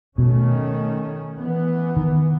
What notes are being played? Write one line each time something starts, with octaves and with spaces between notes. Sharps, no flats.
B2 D#3 A3 C#4
E3 B3
D#3